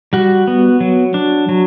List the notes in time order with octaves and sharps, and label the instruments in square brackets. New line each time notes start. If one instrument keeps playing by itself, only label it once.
[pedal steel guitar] G3 F#4
B3
F#3
D4
F#3